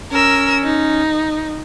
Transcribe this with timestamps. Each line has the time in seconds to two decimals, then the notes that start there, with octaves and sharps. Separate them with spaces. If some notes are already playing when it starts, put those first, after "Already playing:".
0.11 C#4 A#4 E6
0.63 D#4